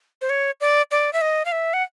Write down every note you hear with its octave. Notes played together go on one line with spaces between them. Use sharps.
C5
C#5
D5
D5
E5
D#5
F5
E5
F#5